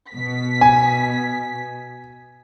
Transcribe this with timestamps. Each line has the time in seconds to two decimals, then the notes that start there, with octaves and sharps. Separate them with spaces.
0.12 B2 B6
0.61 G#5